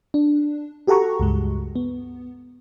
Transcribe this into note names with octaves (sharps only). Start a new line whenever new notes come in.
D4
F#4 G4 A4 F#5 A#5 C#6
C#2 G2 G#3
B3